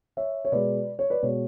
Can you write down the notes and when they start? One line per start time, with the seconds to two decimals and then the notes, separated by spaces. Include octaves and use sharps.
0.17 C#5 E5
0.45 C#5
0.52 B2 G#3 B4 D5
0.99 C#5
1.10 B4 D5
1.22 B2 G#3 C#5